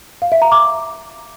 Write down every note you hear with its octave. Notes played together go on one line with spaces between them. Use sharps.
F5
E5
A#5
D6